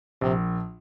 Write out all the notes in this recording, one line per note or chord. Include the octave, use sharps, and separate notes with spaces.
A#1 C3